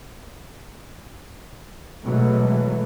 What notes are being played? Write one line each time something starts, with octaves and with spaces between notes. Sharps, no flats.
B2 E3 F#3 G#3 A3